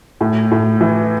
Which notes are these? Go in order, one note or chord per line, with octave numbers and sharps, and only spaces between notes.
A2
A2
E3